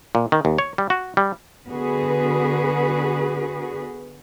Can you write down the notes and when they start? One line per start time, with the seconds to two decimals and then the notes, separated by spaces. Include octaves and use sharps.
0.15 A#2
0.32 D#3
0.45 D#2
0.58 C#5
0.78 G3
0.90 F#4
1.17 G3
1.69 D3 B3 F#4 G#4 B4